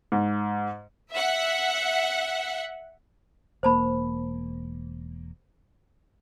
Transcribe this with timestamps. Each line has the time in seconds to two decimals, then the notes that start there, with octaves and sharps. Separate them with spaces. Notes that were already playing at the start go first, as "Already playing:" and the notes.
0.12 G#2
1.11 E5 F#5
3.63 E1 A#3 C5 A5 B5